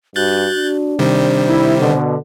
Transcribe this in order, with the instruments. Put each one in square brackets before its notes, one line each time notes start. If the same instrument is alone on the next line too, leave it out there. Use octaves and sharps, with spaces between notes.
[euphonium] G2 [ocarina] F#4 [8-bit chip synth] F#6 G6 A6
[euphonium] D4
[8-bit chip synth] C3 D#3 G3 [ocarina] C5
[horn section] E4
B2 D3